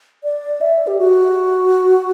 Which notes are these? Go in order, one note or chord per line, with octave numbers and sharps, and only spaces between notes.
D5
E5
G4
F#4